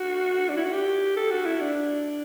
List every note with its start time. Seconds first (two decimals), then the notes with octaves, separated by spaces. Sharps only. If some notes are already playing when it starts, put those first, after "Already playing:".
Already playing: F#4
0.49 D4
0.57 E4
0.65 F#4
0.73 G4
1.17 A4
1.31 F#4
1.46 E4
1.61 D4